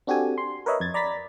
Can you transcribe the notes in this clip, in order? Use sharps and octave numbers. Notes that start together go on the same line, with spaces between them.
C4 D4 F#4 G4 A4 G#5
C6
A#4 B4 C#5 D#5 E5 B5
F2 G#6 A6
D5 A#5 B5 A6 B6